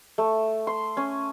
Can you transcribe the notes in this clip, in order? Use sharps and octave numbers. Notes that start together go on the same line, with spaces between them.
A3
C6
C#4